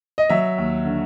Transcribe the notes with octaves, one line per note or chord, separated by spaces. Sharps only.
D#5
F#3 E5
D#2
D3